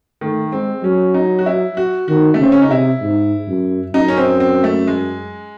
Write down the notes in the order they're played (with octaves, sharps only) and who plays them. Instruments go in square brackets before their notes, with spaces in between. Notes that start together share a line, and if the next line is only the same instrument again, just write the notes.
[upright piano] D#3 [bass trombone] A3
[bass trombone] G#3 [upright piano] C4
[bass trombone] F#3 [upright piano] C#4
[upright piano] D#4
F#4
E4
F#4
[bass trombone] D#3 [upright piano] F#4
[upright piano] A3
[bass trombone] C#3 [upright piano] C4
[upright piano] C#4
D#4
[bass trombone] C3 [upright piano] E4
[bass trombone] G#2
F#2
[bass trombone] F#2 [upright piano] D#4
[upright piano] C#4
C4
C4
A3
G#3